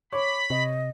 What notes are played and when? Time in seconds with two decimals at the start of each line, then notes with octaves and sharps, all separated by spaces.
0.13 C#5 B5 D6
0.50 C3 D#5